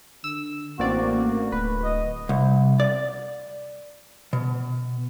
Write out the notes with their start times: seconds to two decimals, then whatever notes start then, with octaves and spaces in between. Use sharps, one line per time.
0.24 D3 E6
0.79 A1 A#3 C4 C#4 F#4 D5
1.19 A3
1.52 D1 B4
1.84 D#5
2.29 C2
2.80 D5
4.33 B2